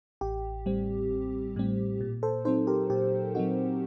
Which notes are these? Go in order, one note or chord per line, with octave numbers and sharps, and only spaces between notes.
A1 G4
A2 G3 C4
A1
A2 G3 C4
A#2
A4 C5
F#3 C4 D#4 A4 C5
G4 A#4
A#2 G4
F#3 C4 D#4 F#4